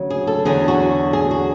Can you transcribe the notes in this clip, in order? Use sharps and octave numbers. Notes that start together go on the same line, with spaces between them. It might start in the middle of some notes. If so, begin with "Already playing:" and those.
Already playing: D2 C#3 F#3
G#4
A4
E2 D3 F#3 G#4
F#4
G#4
F#4